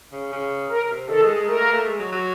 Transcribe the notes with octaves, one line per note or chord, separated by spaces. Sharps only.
C#3
C#3
A#4
C3
D#3 A4
G#3
G#3
A3 A#4
A#3
A3
G#3
F#3
F#3